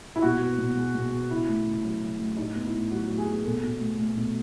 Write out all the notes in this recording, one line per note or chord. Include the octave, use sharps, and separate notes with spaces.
E4
B2 F#4
B3
B2
G#3
B2
B3
C#3 E4
A3
C#3
F#3
C#3
A3
A2 D#4
B3
E4
A2
F#3 F#4
A2
G#4
B3
B2 A4
B2
A3
A3
B2